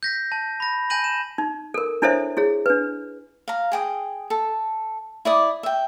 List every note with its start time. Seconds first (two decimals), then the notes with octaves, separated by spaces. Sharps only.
0.03 G6 A#6 B6
0.32 A5
0.60 B5 A#6
0.90 G#5 A5 G6 A#6 D#7 F#7
1.04 E7
1.38 D#4
1.74 A4 A#4
2.02 D4 E4 A4 C5 C#5 E5
2.37 E4 G#4 C#5
2.66 D4 B4
3.48 F5 A#5
3.72 G#4 G5 D#6
4.30 A4
5.25 E4 D5 D#6
5.63 E5 G5